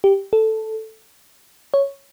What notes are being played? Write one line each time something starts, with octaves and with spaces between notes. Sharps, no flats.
G4
A4
C#5